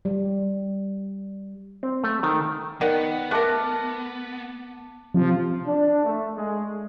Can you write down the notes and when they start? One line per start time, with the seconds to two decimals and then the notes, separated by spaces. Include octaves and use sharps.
0.05 G3
1.83 C4
2.04 A3
2.23 D#3
2.81 D#3 B3 D5 F#5
3.31 A3 A#4 A5 D6 F#6
5.14 C3 F3
5.66 D4
6.04 A3
6.37 G#3